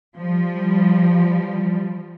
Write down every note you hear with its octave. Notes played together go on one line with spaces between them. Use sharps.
F3 G3